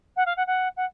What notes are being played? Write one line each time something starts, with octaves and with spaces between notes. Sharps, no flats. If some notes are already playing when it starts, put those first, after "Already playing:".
F#5
F5
F#5
F#5
F#5